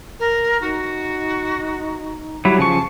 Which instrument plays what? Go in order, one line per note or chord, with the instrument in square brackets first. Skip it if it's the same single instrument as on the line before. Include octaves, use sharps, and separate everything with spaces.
[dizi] A#4
[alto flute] D#4 [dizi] F#4
[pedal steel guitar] F#3 G3 E4 [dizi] F#5
[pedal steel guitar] C#3 F3 C#6 [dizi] A5